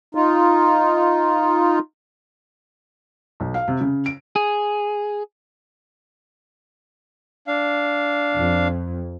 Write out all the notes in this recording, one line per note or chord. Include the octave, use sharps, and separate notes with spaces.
D#4 F4
B1
F5
C3
C#3
D7
G#4
D4 F5
F2